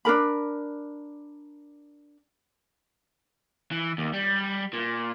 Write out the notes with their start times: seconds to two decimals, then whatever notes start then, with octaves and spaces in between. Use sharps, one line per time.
0.05 D4 D#4 A#4 B5
3.72 E3
3.98 D#2
4.13 G3
4.73 A#2